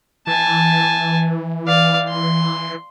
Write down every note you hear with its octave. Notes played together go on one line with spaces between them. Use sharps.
E3 G#5 A5
D5 F5
C6